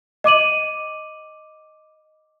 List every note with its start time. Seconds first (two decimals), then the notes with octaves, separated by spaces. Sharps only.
0.24 D#5 D6 D#7 F#7